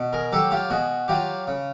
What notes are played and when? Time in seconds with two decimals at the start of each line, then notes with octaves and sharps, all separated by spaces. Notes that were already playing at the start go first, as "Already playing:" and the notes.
Already playing: B2
0.13 G#4 A#4
0.32 F#3 G4 A4
0.51 F4 G4
0.70 B2 F#4 G#4
1.08 F#3 F4 G4
1.47 C#3